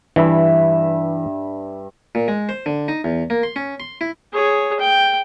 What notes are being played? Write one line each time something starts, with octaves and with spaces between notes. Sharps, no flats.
G2 E3 E5 B5
A#2
G#3
C5
D3
D#4
E2
A#3
C6
C#4
C6
E4
G#4 C#5
G5